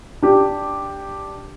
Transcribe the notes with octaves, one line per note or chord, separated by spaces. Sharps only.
D4 G4